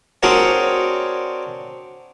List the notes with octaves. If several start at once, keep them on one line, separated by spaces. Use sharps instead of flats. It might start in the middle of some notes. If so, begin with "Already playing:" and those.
C4 D4 F#4 G#4 A#4 C#5